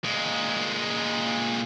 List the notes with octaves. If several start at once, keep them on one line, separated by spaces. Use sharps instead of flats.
A#2 G#3